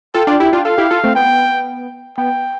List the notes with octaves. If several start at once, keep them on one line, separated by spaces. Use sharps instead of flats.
F4 A4 G5
D4 F4
E4 G4
D4 F4
F4 A4 F5
E4 G4
F4 A4
A3 C4
B3 G5
B3 G5